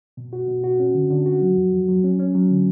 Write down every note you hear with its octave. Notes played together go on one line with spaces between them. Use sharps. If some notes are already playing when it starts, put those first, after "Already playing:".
B2
F#4
B2
F#4
C#4
D3
D3
F#4
F#3
F2
F2
F#3
C#4
C#4
F#3
D3